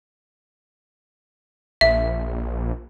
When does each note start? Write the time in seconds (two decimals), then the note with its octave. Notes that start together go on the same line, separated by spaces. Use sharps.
1.81 A#1 E5